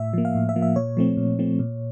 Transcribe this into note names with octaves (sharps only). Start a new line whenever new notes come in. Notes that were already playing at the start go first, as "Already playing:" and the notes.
Already playing: A2 E5
F3 A#3
F5
A2
E5
F3 A#3
E5
A#2 C#5
F3 A3 C4
A#2
F3 A3 C4
A#2